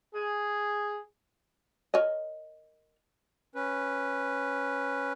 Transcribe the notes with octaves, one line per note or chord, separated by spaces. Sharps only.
G#4
A#4 C#5 D#5
C#4 B4